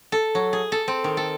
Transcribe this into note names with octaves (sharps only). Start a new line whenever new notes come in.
A4
F#3
G#4
A4
C4
D#3
A4